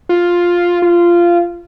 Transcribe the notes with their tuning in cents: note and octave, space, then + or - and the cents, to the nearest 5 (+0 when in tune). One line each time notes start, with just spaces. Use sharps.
F4 +5
F4 -15